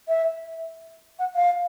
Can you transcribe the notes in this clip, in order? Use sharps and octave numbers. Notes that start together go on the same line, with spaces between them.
E5
F#5
F5